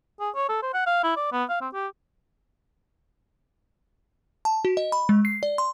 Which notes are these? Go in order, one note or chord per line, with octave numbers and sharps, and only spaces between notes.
G#4
C#5
A4
C5
F#5
F5
E4
D5
B3
F5
C4
G4
A5
F#4
D#5
B5
G#3
C7
D5
C6